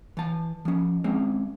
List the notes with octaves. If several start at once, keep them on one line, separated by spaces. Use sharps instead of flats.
E3 A5
F3 C#4
G#3 C4 C#4